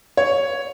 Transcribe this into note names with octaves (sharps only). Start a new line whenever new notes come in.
C#5